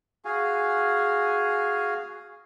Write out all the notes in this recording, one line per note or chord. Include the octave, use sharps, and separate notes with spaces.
F#4 G#4 F5 G#5